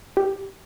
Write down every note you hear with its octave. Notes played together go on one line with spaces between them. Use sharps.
G4